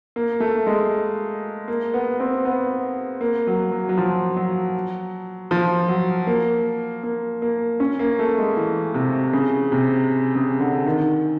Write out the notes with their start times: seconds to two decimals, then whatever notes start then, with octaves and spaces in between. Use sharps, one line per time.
0.16 A#3
0.40 A3
0.67 G#3
1.68 A#3
1.94 B3
2.20 C4
2.45 B3
3.21 A#3
3.47 F#3
3.72 F#3
3.89 F#3
3.98 F3
4.37 F#3
5.51 F3
5.88 F#3
6.27 A#3
7.03 A#3
7.42 A#3
7.80 C#4
7.99 A#3
8.19 A3
8.38 G#3
8.57 E3
8.94 C3
9.33 C#3
9.72 C3
10.35 C#3
10.60 D3
10.86 D#3